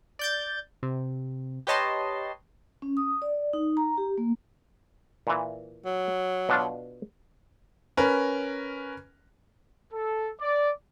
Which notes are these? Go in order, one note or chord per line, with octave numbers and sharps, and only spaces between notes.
D5 G6 A6
C3
G4 B4 C#5 D#5 A5 C6
C#4
D#6
D5
D#4
A#5
G4
A#3
A#2 E3
F#3
B2 D4 F4
C#4 A#4 B4
A4
D5